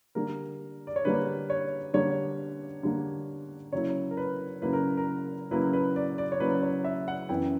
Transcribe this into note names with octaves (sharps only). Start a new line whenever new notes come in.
D3 G3 A#3 A#4
D5
C#5
D3 G3 A#3 B4
C#5
D3 G3 A#3 C#5
D3 G3 A#3
C#3 F#3 A#3 E4 C#5
A#4
B4
C#3 F#3 A#3 E4 B4
A#4
A#4
C#3 F#3 A#3 E4 B4
B4
D5
D5
C#5
C#3 F#3 A#3 E4 B4
C#5
E5
F#5
F#2 E3 B3 E4 G5